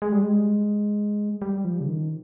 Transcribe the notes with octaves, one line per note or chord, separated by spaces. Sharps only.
G#3
G3
G#3
G3
F3
C#3
D#3